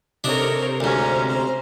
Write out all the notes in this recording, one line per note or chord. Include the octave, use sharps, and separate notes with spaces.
C3 D4 D#4 A4 A#4 C#5
D2 G#2 C#4 C5 A#5
C5 A#5